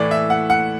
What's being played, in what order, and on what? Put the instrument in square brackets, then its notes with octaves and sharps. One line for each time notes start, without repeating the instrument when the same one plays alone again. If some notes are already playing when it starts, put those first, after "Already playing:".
Already playing: [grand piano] A2 E3 A3 D5
E5
F#5
F#5